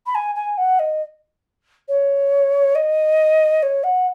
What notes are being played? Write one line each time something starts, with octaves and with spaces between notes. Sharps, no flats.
B5
G#5
G#5
F#5
D#5
C#5
D#5
C#5
F#5